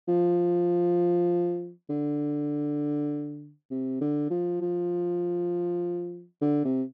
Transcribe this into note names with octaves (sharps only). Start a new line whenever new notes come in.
F3
D3
C3
D3
F3
F3
D3
C3